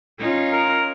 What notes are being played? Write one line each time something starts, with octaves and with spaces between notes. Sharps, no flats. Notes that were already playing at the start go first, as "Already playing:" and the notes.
C#4 D#4 F4
A#4